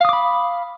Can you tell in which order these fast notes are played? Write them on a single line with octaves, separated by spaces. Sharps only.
F5 D#6 D6 B5